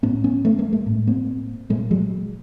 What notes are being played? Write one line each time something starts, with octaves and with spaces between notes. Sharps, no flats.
A2 B3 C#4
B3 C#4
A3 B3
G#3 A#3
G#3 A#3
A2
A#3 C4
A#2 G#3 A#3
F#3 G#3